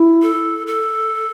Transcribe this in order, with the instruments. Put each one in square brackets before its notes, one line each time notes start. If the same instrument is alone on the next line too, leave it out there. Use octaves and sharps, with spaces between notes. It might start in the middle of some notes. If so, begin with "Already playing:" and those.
Already playing: [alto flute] E4
[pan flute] A4
A4